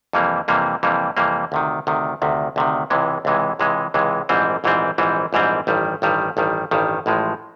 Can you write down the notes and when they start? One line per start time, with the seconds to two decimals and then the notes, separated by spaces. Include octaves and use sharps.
0.13 F2 C3 E3 G3 A#3
0.48 F2 C3 E3 G3 A#3
0.83 F2 C3 E3 G3 A#3
1.17 F2 C3 E3 G3 A#3
1.52 D2 C3 D#3
1.87 D2 C3 D#3
2.22 D2 C3 D#3
2.56 D2 C3 D#3
2.90 C#2 C3 E3 G#3
3.25 C#2 C3 E3 G#3
3.59 C#2 C3 E3 G#3
3.94 C#2 C3 E3 G#3
4.29 A#1 G#2 E3 G3 C4
4.64 A#1 G#2 E3 G3 C4
4.98 A#1 G#2 E3 G3 C4
5.33 A#1 G#2 E3 G3 C4
5.67 A1 G2 D#3 G3
6.02 A1 G2 D#3 G3
6.37 A1 G2 D#3 G3
6.71 A1 G2 D#3 G3
7.06 A1 A2 F3 G#3